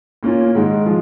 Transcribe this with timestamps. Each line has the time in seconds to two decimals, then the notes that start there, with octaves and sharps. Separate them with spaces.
0.23 A#2 A#3 C#4 F4
0.55 G#2 D#3 G#3 D#4
0.86 F3 G#3 F4